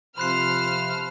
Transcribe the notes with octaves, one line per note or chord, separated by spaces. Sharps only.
C3 F3 C5 B5 F6 F#6 C7